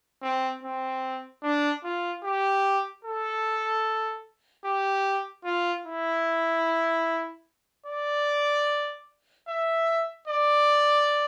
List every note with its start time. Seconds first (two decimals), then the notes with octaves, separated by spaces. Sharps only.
0.23 C4
0.63 C4
1.44 D4
1.84 F4
2.24 G4
3.05 A4
4.65 G4
5.45 F4
5.86 E4
7.86 D5
9.48 E5
10.28 D5